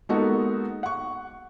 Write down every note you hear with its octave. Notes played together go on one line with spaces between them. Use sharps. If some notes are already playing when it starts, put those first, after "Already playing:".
G#3 A#3 B3 D#4 F#4 A4
F#5 C#6